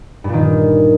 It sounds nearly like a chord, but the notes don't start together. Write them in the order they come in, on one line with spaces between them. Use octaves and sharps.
G2 A#2 D#3